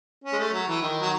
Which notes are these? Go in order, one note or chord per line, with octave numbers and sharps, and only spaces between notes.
C#4
G#3
A3
F#3
E3
D#3
F#3